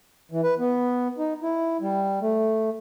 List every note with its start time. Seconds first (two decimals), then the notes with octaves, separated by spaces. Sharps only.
0.31 E3
0.43 B4
0.59 B3
1.18 D#4
1.43 E4
1.81 G3
2.21 A3